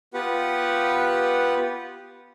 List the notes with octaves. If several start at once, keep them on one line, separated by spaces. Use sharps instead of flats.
B3 F4 G4 B4 F#5